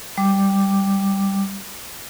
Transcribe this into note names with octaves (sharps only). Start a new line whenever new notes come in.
G3 D6